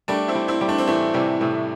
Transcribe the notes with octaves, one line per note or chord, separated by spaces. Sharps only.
G3 A3 D4
C4 E4
G3
C4 E4
G3
A3 D4
C4
A2 E3 A3
C3 E3 G3
A2 C3